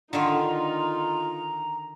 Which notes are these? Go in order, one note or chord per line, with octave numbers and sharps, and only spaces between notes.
D3 D#3 D#4 F4 A#5